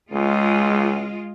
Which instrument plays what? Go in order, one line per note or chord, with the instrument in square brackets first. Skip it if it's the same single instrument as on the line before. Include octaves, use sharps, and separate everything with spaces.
[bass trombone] C#2 [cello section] G#3 F4